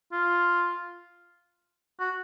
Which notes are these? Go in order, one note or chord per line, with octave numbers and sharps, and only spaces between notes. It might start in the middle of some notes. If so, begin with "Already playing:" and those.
F4
F#4